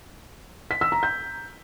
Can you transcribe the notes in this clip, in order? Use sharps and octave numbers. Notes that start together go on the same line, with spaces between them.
B6
E6
A#5
G6